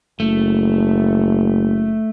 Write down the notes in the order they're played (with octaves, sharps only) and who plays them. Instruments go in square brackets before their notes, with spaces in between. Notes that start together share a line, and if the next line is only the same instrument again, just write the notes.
[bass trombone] F#1 [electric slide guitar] A3